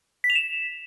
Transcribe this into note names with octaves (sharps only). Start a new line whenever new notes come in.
B6
F7
E7